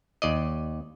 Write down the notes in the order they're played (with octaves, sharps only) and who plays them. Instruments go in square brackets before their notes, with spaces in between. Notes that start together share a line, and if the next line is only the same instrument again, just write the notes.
[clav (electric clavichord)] D#2 D5 D#5